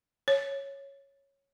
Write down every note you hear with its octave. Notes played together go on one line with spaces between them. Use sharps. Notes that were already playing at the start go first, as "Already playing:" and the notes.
C#5